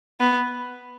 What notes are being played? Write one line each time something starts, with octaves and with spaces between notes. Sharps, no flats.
B3